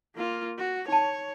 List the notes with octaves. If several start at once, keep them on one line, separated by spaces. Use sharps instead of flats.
A#3 F4
F#4
D#4 C#5 A5